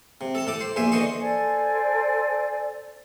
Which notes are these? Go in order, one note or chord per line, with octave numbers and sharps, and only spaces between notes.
C3
A4 A5
A2 A4 D6
C5
A#1 E2 C5 E5 G#5
D3 E3 C5 D#5 C#6
A4 C5 D5 G#5